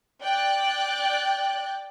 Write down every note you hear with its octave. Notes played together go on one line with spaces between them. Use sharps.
D5 G5 F#6